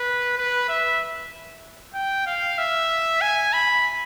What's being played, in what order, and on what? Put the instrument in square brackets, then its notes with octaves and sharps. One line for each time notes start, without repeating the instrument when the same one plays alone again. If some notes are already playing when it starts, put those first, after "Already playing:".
Already playing: [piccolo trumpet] B4
B4
E5
G5
F5
E5
G#5
B5